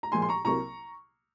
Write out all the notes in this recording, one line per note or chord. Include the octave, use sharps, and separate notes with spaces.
A#5
A#2 F3 G#3 G#5 C6
C6
A#5 C#6
C2 C3 F#3 A#3 A#5 C#6